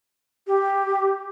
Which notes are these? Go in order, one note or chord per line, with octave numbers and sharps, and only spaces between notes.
G4